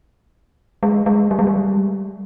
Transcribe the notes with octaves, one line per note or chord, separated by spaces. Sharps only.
G#3
G#3
G3
G#3
G3